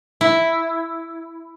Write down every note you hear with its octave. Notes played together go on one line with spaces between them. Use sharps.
E4